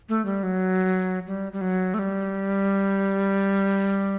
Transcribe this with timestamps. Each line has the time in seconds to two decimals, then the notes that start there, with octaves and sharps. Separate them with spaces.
0.09 A3
0.25 G3
0.43 F#3
1.27 G3
1.53 G3
1.61 F#3
1.94 A3
1.99 G3